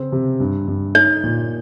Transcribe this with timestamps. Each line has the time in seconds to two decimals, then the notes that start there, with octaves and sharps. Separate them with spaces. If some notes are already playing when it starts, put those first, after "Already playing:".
Already playing: C#3 C4
0.12 C3
0.40 G2
0.68 G2
0.95 D#4 C#5
1.24 A#2